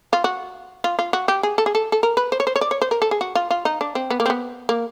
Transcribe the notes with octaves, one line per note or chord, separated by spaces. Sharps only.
F4
F#4
F4
F4
F#4
G4
G#4
A4
G#4
A4
A4
A#4
B4
C5
C#5
C5
C#5
D5
C#5
C5
A#4
A4
G#4
F#4
F4
F4
D#4
D4
C4
B3
A#3
C4
B3
A#3